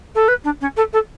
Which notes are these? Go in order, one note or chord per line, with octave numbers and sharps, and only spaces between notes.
A4
B4
D4
C#4
A4
A4